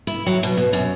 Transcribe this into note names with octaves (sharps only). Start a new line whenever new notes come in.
E4
F#3
B2
B2
F#2